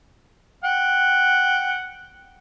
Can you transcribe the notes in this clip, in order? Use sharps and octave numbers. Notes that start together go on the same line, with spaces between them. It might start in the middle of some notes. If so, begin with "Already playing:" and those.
F#5 G5